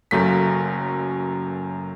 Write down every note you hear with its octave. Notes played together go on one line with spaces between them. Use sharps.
F#1 F#2 A3 B6